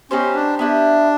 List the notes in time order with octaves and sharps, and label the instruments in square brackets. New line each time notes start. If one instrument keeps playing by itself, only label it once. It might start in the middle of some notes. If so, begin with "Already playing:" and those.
[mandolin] B3 D#4 G4 C5 [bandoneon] C#4
[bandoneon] D4
[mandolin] B3 E4 G4 [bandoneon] D4